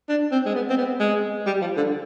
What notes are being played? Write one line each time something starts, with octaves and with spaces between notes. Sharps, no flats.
D4
C4
G#3
B3
C4
B3
G#3
G3
F3
D3